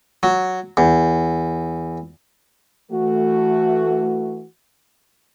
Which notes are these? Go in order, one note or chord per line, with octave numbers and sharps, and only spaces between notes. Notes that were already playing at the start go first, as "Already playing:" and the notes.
F#3
E2
E3 A3 F#4